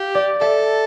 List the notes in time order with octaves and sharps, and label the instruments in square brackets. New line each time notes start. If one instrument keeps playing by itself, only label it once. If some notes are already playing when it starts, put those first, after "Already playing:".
Already playing: [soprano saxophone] G4 [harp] F5
[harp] D5
[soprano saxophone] A4 [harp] E5